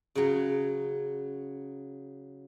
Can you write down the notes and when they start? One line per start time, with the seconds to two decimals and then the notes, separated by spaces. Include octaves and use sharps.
0.15 C#3 F#3